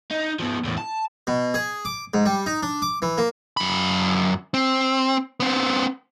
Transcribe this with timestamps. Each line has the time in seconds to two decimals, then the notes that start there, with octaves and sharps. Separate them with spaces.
0.11 D#4
0.39 F3 B3
0.65 E2 A2
0.78 A5
1.27 B2
1.54 G#4
1.85 D6
2.14 G#2
2.26 G3
2.46 D#4
2.63 D4
2.82 D6
3.02 E3
3.18 A#3
3.57 F#2 B5
4.54 C4
5.40 B3 C4